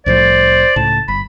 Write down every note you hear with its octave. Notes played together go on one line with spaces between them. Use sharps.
C2 A2 F3 C5 D5
C#2 A2 A5
G1 B5